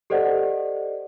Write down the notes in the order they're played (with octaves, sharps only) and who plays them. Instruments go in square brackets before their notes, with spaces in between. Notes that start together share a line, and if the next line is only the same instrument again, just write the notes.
[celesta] G4 A4 C5 D5 D#5 F#5